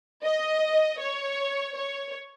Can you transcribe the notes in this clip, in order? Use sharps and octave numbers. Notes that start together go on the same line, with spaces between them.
D#5
C#5
C#5